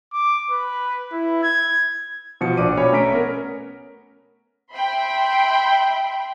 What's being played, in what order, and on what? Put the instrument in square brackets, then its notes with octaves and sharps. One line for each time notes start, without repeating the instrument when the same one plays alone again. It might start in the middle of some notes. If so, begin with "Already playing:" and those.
[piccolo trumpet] D6
B4
E4
G#6
[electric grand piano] B2 F3 C#7
A#1 D5 D6 D#7
B2 B4 C#5 G#5 B5
A3 C#4 A#5 B6 D7
B3 A#4
[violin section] E5 G5 B5 C6